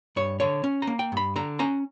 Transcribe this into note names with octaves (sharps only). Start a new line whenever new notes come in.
G2 C#5
D3 C#5
C#4
A#5
A#3
G5
G2 B5
D3 A#5
C#4 A#5